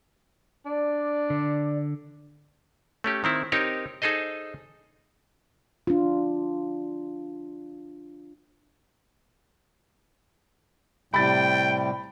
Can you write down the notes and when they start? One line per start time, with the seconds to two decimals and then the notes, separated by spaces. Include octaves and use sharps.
0.66 D4 D5
1.30 D3
3.04 A3 C#4 G4
3.24 D#3 C4 E4
3.52 C4 D#4 G4 A#4 C#5
4.02 D#4 G#4 A4 C5 D#5
5.87 D4 F4
11.14 A2 C3 G3 G5 B5 A6